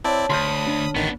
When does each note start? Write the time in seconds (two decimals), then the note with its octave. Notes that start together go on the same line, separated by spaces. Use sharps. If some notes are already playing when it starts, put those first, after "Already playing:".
0.04 C4 E4 C#5 D5 A5
0.30 D2 B5 C6 D#6 F6 G6
0.67 D3
0.95 A1 D#3 B3 D4